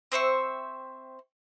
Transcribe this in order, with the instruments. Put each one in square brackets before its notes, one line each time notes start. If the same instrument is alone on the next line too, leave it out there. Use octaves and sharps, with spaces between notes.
[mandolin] C4 C5 E5 C#6